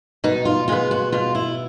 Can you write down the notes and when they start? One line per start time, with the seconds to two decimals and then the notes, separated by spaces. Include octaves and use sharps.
0.24 B2 D#4
0.45 F4
0.68 G#3 B3 F4
0.91 F#4
1.12 B2 F4
1.35 E4